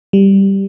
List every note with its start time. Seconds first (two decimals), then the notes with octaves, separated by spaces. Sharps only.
0.13 G3